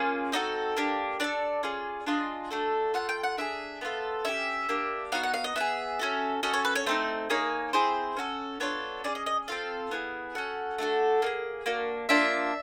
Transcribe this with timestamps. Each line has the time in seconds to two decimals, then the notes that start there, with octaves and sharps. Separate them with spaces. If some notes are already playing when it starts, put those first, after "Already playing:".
Already playing: A#3 C#4 F4 G#4
0.32 C4 D#4 F#4 A4 D#5
0.76 A#3 D4 G4
1.20 D4 F#4 A4 D5
1.63 C#4 F4 G#4
2.06 D4 F4 G#4 D#5
2.50 A3 D4 F#4 A4
2.94 A3 C#4 F4 F#5
3.09 G5
3.23 F#5
3.37 D4 F4 G#4 E5
3.81 B3 D4 F4 A4
4.25 C#4 E4 G4 E5
4.69 A#3 D4 G4
5.12 B3 D#4 F#4 F5
5.23 F#5
5.34 F5
5.44 D#5
5.56 B3 E4 E5
5.60 G#4
5.99 C#4 F#4 A4
6.43 C#4 F#4 A4 D#5
6.54 C#5
6.65 B4
6.75 C#5
6.86 A3 C4 D#4 C5
7.30 A#3 D#4 G#4 C#5
7.73 C4 E4 G#4 C5
8.17 C#4 F#4 A4
8.60 B3 D4 F4 A4 C#5
9.04 C#4 F4 G#4 D5
9.15 D#5
9.26 D#5
9.48 C4 F4 A4 F5
9.91 B3 E4 G#4
10.35 C#4 F#4 A4 F#5
10.78 A3 D4 F#4 A4
11.22 A#3 D#4 G#4
11.66 A#3 D4 F#4
12.09 A#3 D4 F4 E5